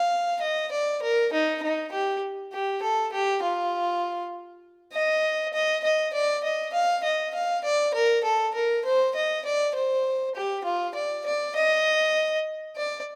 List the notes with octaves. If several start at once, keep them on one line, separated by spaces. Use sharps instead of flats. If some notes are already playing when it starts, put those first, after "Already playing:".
Already playing: F5
D#5
D5
A#4
D#4
D#4
G4
G4
A4
G4
F4
D#5
D#5
D#5
D5
D#5
F5
D#5
F5
D5
A#4
A4
A#4
C5
D#5
D5
C5
G4
F4
D5
D5
D#5
D5